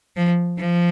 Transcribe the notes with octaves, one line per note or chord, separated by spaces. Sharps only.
F3
F3